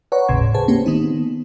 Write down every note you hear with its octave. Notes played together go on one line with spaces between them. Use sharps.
B4 C#5 D5 F#5 A#5 C#6
G#1 D#2 A2 C#3 C6 G#6
G#4 B4 C5 G#5 A5
A#3 C4 C#4 G4
D#3 B3 D#4